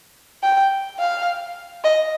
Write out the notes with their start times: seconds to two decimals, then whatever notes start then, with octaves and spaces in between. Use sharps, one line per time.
0.43 G5
0.99 F5
1.84 D#5